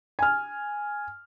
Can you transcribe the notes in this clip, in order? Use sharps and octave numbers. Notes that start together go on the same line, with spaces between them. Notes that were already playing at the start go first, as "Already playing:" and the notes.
G#5 F6